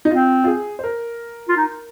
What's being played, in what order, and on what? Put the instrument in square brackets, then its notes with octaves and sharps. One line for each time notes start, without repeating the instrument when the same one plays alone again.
[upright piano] D#4
[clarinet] C4 [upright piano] F4
[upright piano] F4
G#4
C5
A#4
[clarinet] F4
D#4